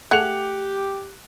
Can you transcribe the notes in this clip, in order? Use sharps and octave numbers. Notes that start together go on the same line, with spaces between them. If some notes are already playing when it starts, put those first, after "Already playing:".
A3 G4 G#4 F#5 F#6 C#7 F7